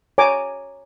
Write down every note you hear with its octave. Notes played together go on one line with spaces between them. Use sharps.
C#5 G#5 A#5 D6